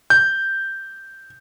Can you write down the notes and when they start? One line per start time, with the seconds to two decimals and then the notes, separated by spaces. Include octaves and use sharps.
0.10 G6